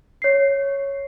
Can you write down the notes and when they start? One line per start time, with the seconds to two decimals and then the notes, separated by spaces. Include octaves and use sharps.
0.22 C#5 C7